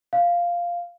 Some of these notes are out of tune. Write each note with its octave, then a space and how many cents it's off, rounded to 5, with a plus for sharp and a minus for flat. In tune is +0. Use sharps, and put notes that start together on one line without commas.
F5 -5